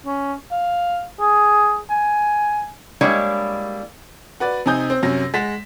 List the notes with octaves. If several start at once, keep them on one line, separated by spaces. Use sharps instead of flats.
C#4
F5
G#4
G#5
G3 G#3 A#3 D4 E4 C#5
F#4 B4 D5 A6
C3 C4 D#4 G#5 D#6 G6
C4
F#2 C3 C#4 A#6
G#3 F#5 A6 B6 E7